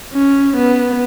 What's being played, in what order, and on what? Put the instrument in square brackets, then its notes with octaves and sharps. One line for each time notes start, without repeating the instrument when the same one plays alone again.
[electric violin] C#4
B3